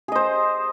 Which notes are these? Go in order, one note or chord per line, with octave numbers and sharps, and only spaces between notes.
G#4 C5 D#5